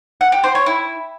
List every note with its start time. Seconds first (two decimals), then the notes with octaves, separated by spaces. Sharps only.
0.21 F#5
0.32 G4
0.44 C5
0.55 C#5
0.66 E4